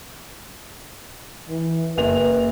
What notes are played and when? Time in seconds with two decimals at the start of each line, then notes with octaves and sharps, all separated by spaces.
1.49 E3
1.97 F#1 B4 F7